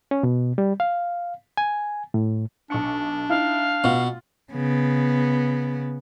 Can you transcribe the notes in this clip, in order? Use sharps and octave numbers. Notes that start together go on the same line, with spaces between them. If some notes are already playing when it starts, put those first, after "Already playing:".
C#4
B2
G3
F5
G#5
A2
B1 D4 C#6 C#7
D#4 E4 F5
B2 F4
C#3 B3